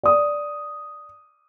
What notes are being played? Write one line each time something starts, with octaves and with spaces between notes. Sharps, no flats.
D5 D#6